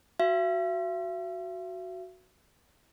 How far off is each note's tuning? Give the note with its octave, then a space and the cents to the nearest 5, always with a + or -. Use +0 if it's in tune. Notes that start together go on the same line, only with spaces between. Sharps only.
F#4 +0 E5 +45